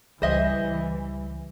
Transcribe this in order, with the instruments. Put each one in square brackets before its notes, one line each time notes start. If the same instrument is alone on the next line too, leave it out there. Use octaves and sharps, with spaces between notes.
[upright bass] C#2 [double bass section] E3 [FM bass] G3 [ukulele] C5 D#5 E5